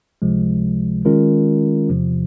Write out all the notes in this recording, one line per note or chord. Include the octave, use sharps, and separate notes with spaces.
C#2 C3 F3 G#3
D#3 G#3 C#4 F4 A#4
E2 C3 F3